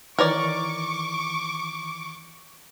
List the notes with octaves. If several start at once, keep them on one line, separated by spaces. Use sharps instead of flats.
D#3 E3 A#4 C#5 D5 C#6 D6